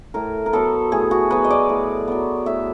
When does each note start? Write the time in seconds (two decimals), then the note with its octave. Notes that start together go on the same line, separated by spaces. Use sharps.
0.14 A2 A#4
0.46 A#4
0.53 F#3 B3 A4
0.92 A2 G#4
1.11 F#4
1.31 F#3 B3 B4
1.44 D#5
1.50 D5
1.69 A2
2.08 F#3 B3
2.46 A2 E5